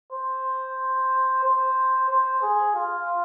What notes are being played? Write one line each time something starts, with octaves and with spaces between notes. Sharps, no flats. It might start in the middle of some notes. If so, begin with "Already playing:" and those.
C5
C5
C5
G#4
F4